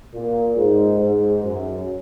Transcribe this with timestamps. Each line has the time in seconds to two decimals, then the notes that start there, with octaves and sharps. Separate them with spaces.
0.13 A#2
0.57 G#2
0.99 G#2
1.43 F#2